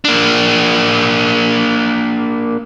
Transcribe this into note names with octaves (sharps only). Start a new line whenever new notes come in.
A#3 D4